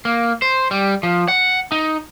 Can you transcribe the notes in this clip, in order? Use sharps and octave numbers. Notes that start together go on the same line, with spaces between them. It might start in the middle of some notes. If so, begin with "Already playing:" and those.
A#3
C5
G3
F3
F#5
D#4